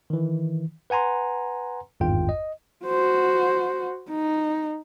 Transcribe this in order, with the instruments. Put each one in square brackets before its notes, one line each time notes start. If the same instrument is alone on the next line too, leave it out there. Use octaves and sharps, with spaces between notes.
[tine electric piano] D#3 E3
B4 F#5 G#5 A#5 C6
G#1 E2 G2 F4 G5
D#5
[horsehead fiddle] F#4 C5
D#4